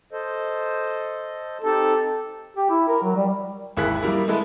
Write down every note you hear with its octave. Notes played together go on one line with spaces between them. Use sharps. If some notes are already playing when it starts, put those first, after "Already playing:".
A4 C5 D#5
C4 D#4 G4 A4
G4
E4
A#4
F#3
G3
G#1 D#2 E4 G#4 F#6 B6
F3 G3 A#3 E4
G#3 B3 E4 A4 B4 E5